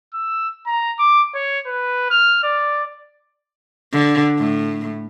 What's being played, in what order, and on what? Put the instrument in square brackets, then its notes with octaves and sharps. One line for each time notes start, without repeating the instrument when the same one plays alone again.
[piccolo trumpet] E6
A#5
D6
C#5
B4
F6
D5
[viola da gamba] D3
A2